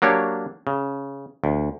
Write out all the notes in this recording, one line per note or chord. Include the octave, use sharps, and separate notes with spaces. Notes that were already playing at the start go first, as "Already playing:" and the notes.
F#3 A#3 D4 G4 C#5
C#3
D2